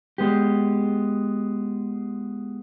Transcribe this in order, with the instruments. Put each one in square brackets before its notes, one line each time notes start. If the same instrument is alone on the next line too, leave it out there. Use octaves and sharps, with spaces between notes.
[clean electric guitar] G#3 B3 G4